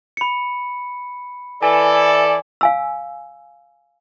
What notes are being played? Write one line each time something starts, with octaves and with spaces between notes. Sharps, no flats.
B5 C#7
E3 A4 D5 G#5
F5 G#5 E6